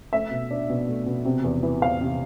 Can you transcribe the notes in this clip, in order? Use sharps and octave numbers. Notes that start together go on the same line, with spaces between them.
A3 E5
B2
D4
B2
A3
B2
C3
E2
E3
E2 F5
C3